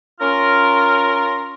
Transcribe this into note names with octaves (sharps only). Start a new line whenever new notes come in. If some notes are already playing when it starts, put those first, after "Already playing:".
C#4 F4 A#4